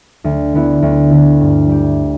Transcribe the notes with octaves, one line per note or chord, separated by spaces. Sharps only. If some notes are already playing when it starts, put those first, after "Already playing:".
D2
D3 B3 E4
D2
D3 B3 E4
G2
G3 E4 G4